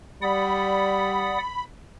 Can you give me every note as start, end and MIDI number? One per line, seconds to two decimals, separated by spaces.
0.22 1.42 55
0.22 1.38 74
0.22 1.38 78
0.22 1.64 83
0.22 1.38 87